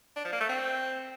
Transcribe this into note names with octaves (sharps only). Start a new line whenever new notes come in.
D4
F3
A#3
A3
C4